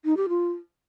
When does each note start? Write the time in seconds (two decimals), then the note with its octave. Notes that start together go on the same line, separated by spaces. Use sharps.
0.05 D#4
0.17 G4
0.29 F4